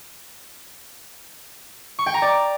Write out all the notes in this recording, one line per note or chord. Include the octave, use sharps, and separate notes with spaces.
C#6
G5
A#5
D5